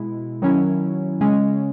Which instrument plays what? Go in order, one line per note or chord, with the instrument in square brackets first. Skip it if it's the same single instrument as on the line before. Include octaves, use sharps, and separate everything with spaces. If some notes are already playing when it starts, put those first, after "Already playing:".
Already playing: [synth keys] B2 G#3 E4
D#3 F#3 C#4 E4
C#3 G#3 C#4